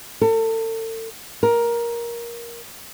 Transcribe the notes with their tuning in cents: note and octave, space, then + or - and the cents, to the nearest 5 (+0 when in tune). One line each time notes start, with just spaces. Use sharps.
A4 +35
A#4 +15